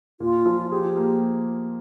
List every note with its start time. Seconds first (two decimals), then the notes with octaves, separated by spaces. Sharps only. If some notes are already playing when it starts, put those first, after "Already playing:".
0.20 A#2 F4
0.46 F3
0.71 G4 G#4
0.97 A#3